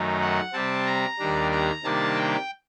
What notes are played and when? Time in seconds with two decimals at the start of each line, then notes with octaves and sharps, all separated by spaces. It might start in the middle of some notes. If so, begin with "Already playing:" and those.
Already playing: F#2 D#3 A3 D#4
0.22 F#5
0.53 C3 G3 C4 A5
0.86 A#5
1.19 D#2 D#3 G3 D4
1.52 A#5
1.83 C3 D#3 G3 A#3 D4 A5
2.17 G5